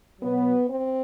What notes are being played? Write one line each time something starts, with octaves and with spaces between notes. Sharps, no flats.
B2 F#3 B3
C4